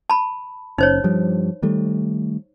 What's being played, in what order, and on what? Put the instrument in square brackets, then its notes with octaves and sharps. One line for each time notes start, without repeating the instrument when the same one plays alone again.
[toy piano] A5 B5
[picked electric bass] F#1 C#4 [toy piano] D#4 C5 C#5
[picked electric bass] G2 F3 G3
D#3 G3 A3